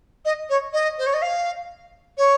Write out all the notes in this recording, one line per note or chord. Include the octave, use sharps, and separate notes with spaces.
D#5
C#5
D#5
C5
C#5
D#5
F5
C#5